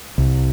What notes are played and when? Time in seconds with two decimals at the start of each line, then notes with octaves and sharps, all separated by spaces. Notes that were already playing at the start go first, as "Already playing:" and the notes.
0.18 C2